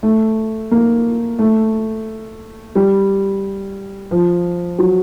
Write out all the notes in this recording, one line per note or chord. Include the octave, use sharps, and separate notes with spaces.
A3
A#3
A3
G3
F3
F#3